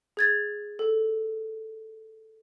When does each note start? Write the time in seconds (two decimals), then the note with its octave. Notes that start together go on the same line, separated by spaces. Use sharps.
0.17 G#4 G#6 A6
0.79 A4